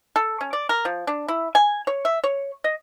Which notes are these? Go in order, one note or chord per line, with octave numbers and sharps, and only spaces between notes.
A4
C#4
D5
A#4
F3
D4
E4
G#5
C#5
E5
C#5
D#5